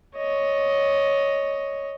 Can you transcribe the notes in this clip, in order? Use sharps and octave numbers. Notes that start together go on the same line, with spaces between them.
C#5 D#5